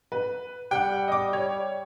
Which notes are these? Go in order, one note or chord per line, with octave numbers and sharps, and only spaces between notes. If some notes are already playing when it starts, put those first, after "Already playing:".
B4
G3 F#5 G5
D#5 D6
C#5